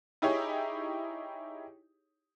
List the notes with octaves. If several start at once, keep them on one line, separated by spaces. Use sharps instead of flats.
D#4 E4 G4 G#4 C#5